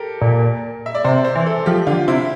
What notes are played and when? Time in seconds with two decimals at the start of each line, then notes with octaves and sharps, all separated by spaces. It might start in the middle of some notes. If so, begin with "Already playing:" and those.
Already playing: G4 A4 A#4
0.21 A#2
0.86 E5
0.95 D5
1.04 C3 C5
1.24 C5
1.35 E3
1.46 A4
1.66 F3 G4
1.87 D3 F4
2.08 C3 E4